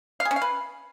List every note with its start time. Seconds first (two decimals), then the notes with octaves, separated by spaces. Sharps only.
0.20 F5
0.25 G#4
0.31 C#4
0.36 F5
0.41 B4